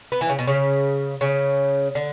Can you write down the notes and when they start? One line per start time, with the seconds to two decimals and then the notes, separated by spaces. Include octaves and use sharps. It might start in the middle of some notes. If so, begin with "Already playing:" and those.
0.12 B3
0.21 E3
0.29 C#3
0.39 B2
0.48 C#3
1.21 C#3
1.95 D3